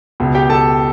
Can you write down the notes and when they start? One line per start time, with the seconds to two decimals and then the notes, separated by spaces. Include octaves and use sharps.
0.20 C#2 B2
0.35 G4 G5
0.49 A4 A5